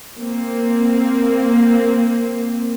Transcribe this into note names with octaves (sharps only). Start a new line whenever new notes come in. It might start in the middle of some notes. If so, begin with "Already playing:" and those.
A#3 C4